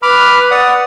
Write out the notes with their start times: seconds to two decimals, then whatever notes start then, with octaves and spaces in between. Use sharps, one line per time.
0.02 B4 B5 D6 F6
0.51 D5 F#5 D#6